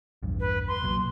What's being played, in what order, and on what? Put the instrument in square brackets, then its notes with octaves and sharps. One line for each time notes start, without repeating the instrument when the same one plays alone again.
[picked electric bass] A#1 E2 G2
[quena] B4
C6
[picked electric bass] B1 A#2 F#3